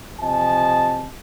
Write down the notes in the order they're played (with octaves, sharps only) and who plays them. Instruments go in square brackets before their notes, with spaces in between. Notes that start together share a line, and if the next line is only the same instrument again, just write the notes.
[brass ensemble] C3 F3 D#5 G#5 A5